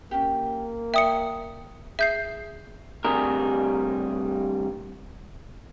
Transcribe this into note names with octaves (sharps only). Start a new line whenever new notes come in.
A#3 C#4 G4
D5 E5 G5 D#6 C#7
G#4 E5 G6 C7
D2 G2 C3 G3 G#4 A#4